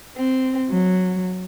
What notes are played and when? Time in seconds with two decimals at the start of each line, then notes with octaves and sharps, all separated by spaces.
0.17 C4
0.69 F#3